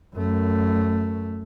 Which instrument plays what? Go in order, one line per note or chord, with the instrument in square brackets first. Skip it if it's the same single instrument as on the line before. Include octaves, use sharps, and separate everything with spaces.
[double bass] F#2 A3